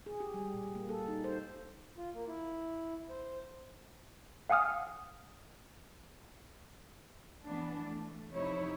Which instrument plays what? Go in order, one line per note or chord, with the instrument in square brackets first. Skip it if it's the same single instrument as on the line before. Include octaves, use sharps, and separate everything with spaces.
[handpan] G#4
G4
G3
A#2
A#3
A4
D#4
C5
[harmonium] F4
A#3
E4
C5
[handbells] F5 F#5 G#5 D#6 F6
[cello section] E3 B3 D4
A3
F2 C3 D#4 E4 C#5